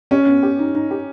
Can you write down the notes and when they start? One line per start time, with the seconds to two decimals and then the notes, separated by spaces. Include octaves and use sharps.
0.11 C#4 G4
0.26 B3
0.43 G4
0.59 D#4
0.75 D#4
0.91 G4